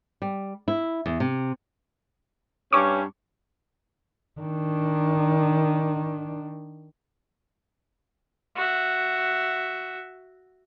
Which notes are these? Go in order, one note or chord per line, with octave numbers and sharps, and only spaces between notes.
G3
E4
E2
C3
G2 C#4 C#6 D6
D#3 D4
F#4 E5